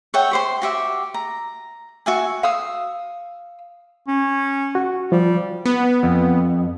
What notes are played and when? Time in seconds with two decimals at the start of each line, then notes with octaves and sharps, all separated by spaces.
0.14 C#5 E5 F#5 G5
0.31 G4 C5 C6
0.62 F#4 G4 E5
1.14 A#5
2.06 F#4 E5 G#5
2.43 F5 D#6 E6
4.08 C#4
4.75 F#4
5.12 F3 G3
5.65 B3
6.03 F2